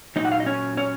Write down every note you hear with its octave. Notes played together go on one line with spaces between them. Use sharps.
A#2 F#3 D#4 D#5 F#5
F5
D#5
C#4 C#5
C#4 C#5